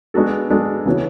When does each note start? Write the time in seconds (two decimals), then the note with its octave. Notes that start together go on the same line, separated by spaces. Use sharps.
0.14 G#3 B3 D4 F#4 A4
0.50 G#3 B3 D4 F#4 A4
0.85 C#3 E3 B3 F#4 C#5